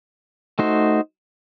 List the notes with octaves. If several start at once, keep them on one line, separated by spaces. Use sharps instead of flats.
A3 D#4 F#4 C5